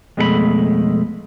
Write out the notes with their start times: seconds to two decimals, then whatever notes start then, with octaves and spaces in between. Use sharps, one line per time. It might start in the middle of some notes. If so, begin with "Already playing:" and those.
0.17 F2 B2 G#3 A3 G#4 B5